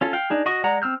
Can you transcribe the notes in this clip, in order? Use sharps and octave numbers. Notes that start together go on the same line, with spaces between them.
C#4 F4 A4
F5 G5
D4 D#4 G#4
F#4 D#5 C#6 D#6
G#3 D5 F#5 A#5
C4 E6 F6 G6